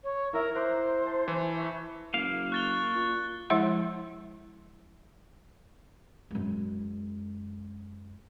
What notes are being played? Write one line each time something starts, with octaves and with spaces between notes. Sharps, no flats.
C#5
E4 A#4 E5
C5 A#5 D6 F#6
A5
E3
E5 B5 C#6 G6
F#1 A#3 F5
C#6 F#6 A6 G7
A#2
F3 G#3 E4 E5 F#5 C6
F#2 G#3